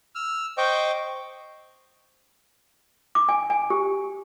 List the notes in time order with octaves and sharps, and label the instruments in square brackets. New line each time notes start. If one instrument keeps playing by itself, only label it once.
[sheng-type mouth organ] E6 F6
C5 D#5 G5 C#6 D6
[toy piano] D6
G#5
G#5
G4